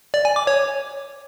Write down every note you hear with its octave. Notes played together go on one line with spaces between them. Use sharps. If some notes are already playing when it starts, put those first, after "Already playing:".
D5
G#5
D6
C#5